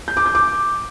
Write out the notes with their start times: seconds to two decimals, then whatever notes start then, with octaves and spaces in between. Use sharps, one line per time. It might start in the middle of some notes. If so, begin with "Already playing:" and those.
0.08 G6
0.17 D6
0.26 G6
0.35 D6